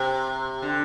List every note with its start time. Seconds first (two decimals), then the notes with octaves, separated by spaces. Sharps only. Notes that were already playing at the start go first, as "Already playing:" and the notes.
Already playing: C3
0.62 D3